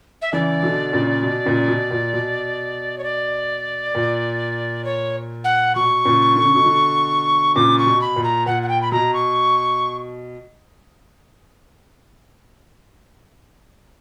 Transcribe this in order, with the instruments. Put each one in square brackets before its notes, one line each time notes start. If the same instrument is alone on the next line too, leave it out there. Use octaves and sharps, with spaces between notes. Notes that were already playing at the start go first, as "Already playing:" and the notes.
[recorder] E5
[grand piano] C#3 E3 [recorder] D5
[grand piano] B2 D3
A#2 C#3
B2
A#2 C#3
B2
A#2
B2
[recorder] C#5
D5
[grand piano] A#2
[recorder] C#5
F#5
[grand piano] B2 [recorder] C#6
[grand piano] A#2 C#3
D3
C#3
B2 D3
B2 D3
[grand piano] A#2 C#3 [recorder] D6
[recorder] C#6
[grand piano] B2
[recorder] B5
[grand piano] A#2
[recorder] A#5
[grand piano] A#2 [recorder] F#5
[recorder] F#5
G5
B5
[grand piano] B2 [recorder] A#5
[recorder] C#6